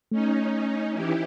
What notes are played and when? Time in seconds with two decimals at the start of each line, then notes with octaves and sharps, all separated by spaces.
0.12 A3 C#4 D#4
0.94 E3 E4 G4